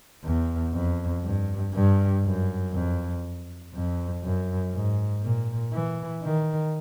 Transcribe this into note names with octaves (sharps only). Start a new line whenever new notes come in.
E2
F2
G2
G2
F#2
F2
F2
F#2
G#2
A#2
E3
D#3